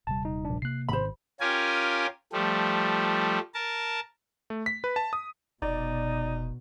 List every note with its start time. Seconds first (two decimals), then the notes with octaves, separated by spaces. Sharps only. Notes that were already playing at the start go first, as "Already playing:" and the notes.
0.07 D#1 C3 G3 A5
0.25 D#4
0.45 A#1 D4
0.62 C3 A#3 F#6 C7
0.89 G#1 C5 B5
1.40 C#4 F4 G4 A#4 G#5
2.33 F3 G3 A3
3.54 A#4 A5
4.50 A3
4.66 B6
4.84 B4
4.96 A5
5.13 D#6
5.62 F1 B2 D#4 D5